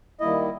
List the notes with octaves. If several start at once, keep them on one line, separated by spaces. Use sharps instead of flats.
D#3 G3 A#3 E4 D#5